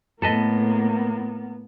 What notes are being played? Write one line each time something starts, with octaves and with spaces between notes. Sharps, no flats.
A2 A#3 B3 A4 B4 D#5 A5